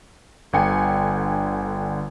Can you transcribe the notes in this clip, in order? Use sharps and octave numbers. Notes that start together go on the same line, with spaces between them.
G1 D3 G5 G#5 C#7